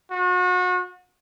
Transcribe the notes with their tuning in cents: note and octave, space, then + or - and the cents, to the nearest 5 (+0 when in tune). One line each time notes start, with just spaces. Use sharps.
F#4 -35